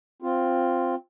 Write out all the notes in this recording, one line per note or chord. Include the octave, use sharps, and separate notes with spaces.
C4 F4